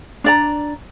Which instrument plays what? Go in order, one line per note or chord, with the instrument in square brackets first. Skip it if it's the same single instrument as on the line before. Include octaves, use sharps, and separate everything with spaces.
[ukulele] D4 D5 A#5